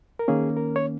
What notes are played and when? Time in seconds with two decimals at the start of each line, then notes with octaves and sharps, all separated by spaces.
0.19 A#4
0.28 D#3 A#3 C#4 G#4
0.57 A#4
0.76 C#5